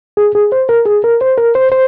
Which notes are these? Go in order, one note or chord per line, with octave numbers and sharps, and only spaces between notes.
G#4
G#4
C5
A#4
G#4
A#4
C5
A#4
C5
C5